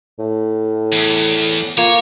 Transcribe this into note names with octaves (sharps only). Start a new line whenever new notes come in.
A2
E2
A#3 F4 C#5